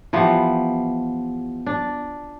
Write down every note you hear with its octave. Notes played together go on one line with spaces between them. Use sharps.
E3 F3 B3 G4
D4